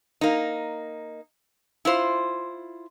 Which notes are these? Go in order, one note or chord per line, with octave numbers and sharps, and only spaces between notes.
A#3 D#4
E4 F4 C5